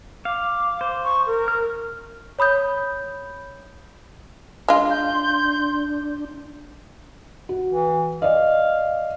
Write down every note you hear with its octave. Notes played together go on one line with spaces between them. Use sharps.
F5 D6
C5
C#6
A#4
F6
C#5 B5 D#6 G6
G#3 D4 F4 C6
G6
F#4
E3
D5 D#5 F5